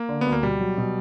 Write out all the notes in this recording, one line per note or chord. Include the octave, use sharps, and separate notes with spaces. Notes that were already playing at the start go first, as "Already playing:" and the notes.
Already playing: A#3
D3
D2 B3
A#3
B2 G3
F#3
B2